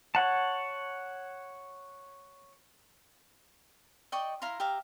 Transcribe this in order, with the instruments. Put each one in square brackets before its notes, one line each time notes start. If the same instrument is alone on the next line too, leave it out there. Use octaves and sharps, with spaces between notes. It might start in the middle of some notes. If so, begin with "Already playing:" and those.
[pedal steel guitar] C#5 F#5 A5
[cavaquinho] D5 D#5 G5 C#6
E4 F5 A#5 C6
G4 E5 F5 A#5